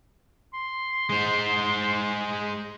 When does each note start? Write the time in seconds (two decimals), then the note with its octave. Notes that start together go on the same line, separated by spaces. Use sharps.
0.54 C6
1.10 G#3 C5